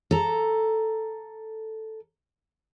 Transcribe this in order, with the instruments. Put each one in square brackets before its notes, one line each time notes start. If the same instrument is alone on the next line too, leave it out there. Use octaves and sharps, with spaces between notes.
[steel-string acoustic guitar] A4 A#5